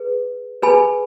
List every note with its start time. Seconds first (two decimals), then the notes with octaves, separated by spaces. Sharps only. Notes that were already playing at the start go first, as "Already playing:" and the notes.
Already playing: G#4 B4
0.62 G#4 B4 G#5 B5